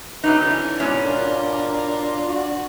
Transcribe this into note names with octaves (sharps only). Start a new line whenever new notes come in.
C#3 F#3 D#4 B4
D3 E3 C#4
G#2 B2 C#4
D4 F4 A#4
F#4